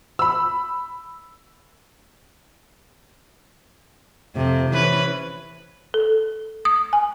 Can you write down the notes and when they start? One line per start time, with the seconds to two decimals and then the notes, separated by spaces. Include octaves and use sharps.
0.19 B5 E6
4.35 F2 C3
4.71 E3 C#4 B4
5.94 A4
6.65 D#6
6.93 G#5